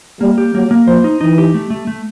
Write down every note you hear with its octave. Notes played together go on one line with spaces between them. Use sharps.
G3 A#3
G4
F#3 A#3
A#3
F3 C5
D#4
E3 D#4
G4
A3
A3
A3